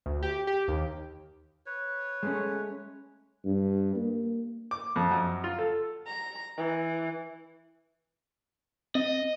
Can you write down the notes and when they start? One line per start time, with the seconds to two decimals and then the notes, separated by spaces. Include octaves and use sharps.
0.06 D2
0.23 G4
0.47 G4
0.68 D#2
1.66 B4 C#5
2.23 G#3 A3 C#4
3.45 G2
3.96 A#3
4.71 D6
4.96 F2
5.11 F#2
5.44 F4
5.58 A4
6.07 A#5
6.57 E3
8.95 C4 D#5